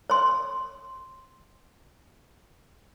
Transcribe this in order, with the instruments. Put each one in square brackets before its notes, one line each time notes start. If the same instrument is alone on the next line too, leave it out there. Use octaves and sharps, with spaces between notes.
[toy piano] C#5 C6